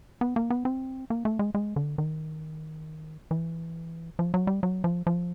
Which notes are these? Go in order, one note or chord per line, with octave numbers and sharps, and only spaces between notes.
B3
A#3
B3
C4
A#3
A3
G#3
G#3
D3
D#3
E3
F3
F#3
G3
F#3
F3
F3